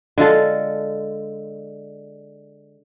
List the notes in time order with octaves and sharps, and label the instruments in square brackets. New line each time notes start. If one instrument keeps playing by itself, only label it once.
[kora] D3 G#3 F4 A4